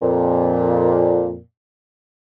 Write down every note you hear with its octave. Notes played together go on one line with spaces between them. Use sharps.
F2 A#2